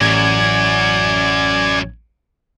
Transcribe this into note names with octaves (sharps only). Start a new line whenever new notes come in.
A1 F#2 D5 G#5 G#6